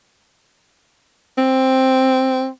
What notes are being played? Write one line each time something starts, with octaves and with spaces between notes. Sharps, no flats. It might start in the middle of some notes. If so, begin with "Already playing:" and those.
C4